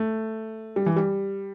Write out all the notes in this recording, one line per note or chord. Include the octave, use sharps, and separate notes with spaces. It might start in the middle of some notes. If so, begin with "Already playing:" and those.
Already playing: A3
G3
E3
G3